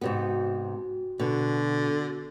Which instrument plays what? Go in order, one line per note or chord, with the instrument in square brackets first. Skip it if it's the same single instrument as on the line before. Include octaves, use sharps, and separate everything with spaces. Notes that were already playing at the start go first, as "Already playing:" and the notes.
[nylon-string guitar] G#2 C3 B3 [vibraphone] F#4
[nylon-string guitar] B2 [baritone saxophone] D3